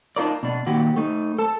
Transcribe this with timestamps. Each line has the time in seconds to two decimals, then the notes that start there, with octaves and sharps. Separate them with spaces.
0.16 D4 D#4 F4 A#4 D5
0.43 B2 D4
0.66 A#2 D#3 F#4 G4
0.96 A3 D#4
1.38 A4 A5